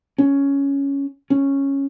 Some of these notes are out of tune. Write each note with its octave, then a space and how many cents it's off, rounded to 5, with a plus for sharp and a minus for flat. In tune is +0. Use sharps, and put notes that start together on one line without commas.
C#4 +5
C#4 -5